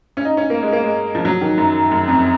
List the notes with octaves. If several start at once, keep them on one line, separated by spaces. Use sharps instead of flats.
C#4
D#4
C#4
A#3
G#3
A#3
G#3
F3
F#3
D#3
F#2
F#2
F2